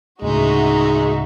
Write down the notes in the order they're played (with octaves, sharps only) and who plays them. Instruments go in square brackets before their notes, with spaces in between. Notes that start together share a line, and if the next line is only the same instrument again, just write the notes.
[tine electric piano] D2 A2 C#3 [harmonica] G#3 [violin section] D#4 F#4 E5